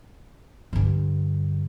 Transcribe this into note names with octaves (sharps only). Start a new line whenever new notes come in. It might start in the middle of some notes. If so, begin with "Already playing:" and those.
G2 D3